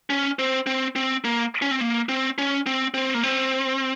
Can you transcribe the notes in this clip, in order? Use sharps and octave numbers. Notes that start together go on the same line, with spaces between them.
C#4
C4
C4
C4
A#3
C#4
C4
A#3
C4
C#4
C4
C4
A#3
C4